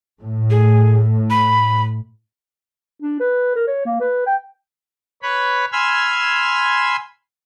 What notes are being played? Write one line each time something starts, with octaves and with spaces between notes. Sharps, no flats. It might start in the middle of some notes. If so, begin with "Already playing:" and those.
A2
G#4
B5
D4
B4
A#4
C#5
A#3
B4
G5
B4 C#5 B5
G#5 B5 C6 E6 F6 G#6